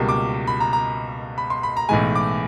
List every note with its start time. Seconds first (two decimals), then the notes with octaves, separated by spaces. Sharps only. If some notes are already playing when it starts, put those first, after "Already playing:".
Already playing: C#2 B2 G3 A#3
0.09 D6
0.47 B5
0.60 A#5
0.73 A#5
1.38 B5
1.50 C6
1.63 B5
1.77 A#5
1.89 B1 A2 E3 G#3 G#5
2.16 D6